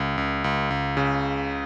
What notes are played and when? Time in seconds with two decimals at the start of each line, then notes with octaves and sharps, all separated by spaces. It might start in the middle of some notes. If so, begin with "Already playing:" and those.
Already playing: C#2
0.18 C#2
0.44 C#2
0.70 C#2
0.97 C#3